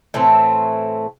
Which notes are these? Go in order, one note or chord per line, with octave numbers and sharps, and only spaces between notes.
A2 E3 A3 C4